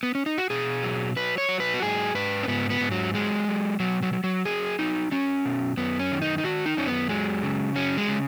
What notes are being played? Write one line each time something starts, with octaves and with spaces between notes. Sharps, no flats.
B3
C#4
D#4
F#4
B2 G#4
F#3
F#3 B4
C#5
F#3
B4
F#4
G#2 G#4
G#2 B4
C#4
G#2 B3
B3
G#2
F#3
F#3 G#3
F#3
B2 F#3
F#3
F#3
F#3
F#3 G#4
F#3 D#4
F#3 C#4
B2
F#2 B3
C#4
D#3
D#4
D#4
D#3 F#4
D#4
F#2 C#4
B3
F#3 G#3
C#3
F#3 C#4
G#3
C#3